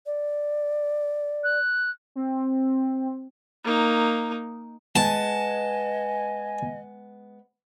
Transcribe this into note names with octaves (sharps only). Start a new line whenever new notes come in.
D5
F#6
C4
A#3 D#4
G#3 B3 D#5 G#5 A5